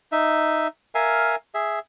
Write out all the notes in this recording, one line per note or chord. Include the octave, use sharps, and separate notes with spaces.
D#4 E5
A#4 E5 F5 G#5
G#4 E5